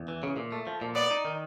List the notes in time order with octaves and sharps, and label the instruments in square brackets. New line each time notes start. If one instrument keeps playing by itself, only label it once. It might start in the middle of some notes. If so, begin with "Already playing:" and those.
Already playing: [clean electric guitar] E2
E3
C#3
A#2
A3
F3
A#2
[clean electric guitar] B3 [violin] D5
[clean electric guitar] D#4
D#3